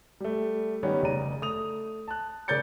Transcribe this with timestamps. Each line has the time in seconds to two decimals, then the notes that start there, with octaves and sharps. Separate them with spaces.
0.20 G3 A3
0.83 D#3 G3 B3 C#4
1.02 F1 C#3 D5 A#5 D#7
1.42 A3 D#6 F7
2.08 A5 F#6
2.48 C#3 A#4 D5 G6 A6 C#7